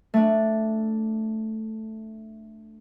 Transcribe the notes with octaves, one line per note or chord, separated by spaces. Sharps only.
A3 D4